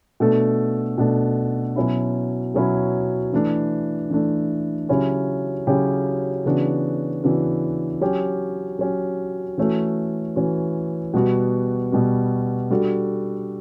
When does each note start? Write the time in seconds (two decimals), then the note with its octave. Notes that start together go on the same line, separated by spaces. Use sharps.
0.20 B2 A3 D4 A4
0.98 B2 A3 D4 A4
1.76 B2 F#3 C#4 E4
2.54 B2 F#3 C#4 E4
3.33 E3 A3 D4
4.10 E3 A3 D4
4.89 C#3 F#3 C#4 E4 G4
5.67 C#3 F#3 C#4 E4 G4
6.46 C#3 E3 B3 D4 F#4
7.24 C#3 E3 B3 D4 F#4
8.01 F#3 C#4 G4
8.79 F#3 C#4 G4
9.58 E3 A3 C#4 F#4
10.36 E3 A3 C#4 F#4
11.14 B2 G3 B3 F#4
11.92 B2 G3 B3 F#4
12.71 G3 D4 F#4 A4